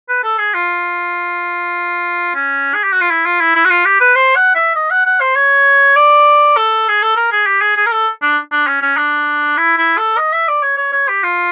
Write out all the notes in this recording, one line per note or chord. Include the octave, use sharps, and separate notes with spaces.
B4
A4
G#4
F4
C#4
G#4
G4
F#4
F4
E4
F4
E4
E4
F#4
F4
G4
B4
C5
F#5
E5
D#5
F#5
F#5
C5
C#5
D5
A4
G#4
A4
A#4
G#4
G4
G#4
G#4
A#4
A4
D4
D4
C#4
C#4
D4
E4
E4
A4
D#5
E5
D5
C#5
C#5
C#5
G4
F4